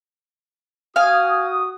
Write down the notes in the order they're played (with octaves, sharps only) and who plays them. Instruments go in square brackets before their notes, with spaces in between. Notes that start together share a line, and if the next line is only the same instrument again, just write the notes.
[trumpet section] F#4 D#6 [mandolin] F5 G#5